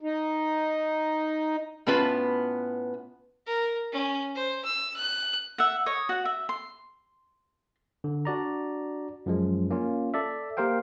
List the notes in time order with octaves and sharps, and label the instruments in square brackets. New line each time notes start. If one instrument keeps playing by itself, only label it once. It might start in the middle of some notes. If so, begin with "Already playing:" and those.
[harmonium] D#4
[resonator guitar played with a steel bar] A2 B3 C#4 F4 B4 A5
[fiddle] A#4
C#4
C5
E6
F#6
[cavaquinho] E5 F#5
C#5 D#5
F#4 F#5
E5
C6
[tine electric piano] D3
D4 F#4 D5 A#5
F#2 F3 G#3
A#3 C#4 F4
A4 D5 E5
A#3 G4 A#4 C5 F5 G5